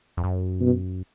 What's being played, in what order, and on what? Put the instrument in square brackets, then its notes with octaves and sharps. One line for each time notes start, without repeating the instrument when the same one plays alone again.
[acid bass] F2
F#2
[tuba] B2